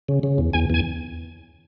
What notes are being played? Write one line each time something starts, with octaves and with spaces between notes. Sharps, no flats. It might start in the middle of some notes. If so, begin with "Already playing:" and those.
C#3
C#3
E2
E2 G#5
E2 G#5